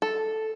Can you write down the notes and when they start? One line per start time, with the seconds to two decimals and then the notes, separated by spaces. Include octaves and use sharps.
0.02 A4